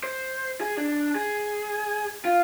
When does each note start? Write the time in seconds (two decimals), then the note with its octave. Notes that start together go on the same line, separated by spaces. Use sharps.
0.03 C5
0.61 G#4
0.77 D4
1.15 G#4
2.25 F4